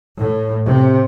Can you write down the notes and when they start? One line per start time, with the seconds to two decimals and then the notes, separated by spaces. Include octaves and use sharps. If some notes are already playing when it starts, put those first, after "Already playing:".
0.18 A2
0.65 C3